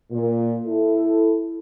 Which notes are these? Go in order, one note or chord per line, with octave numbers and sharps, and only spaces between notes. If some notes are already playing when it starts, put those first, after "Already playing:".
A#2
E4 A4